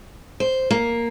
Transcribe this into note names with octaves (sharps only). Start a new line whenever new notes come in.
C5
A#3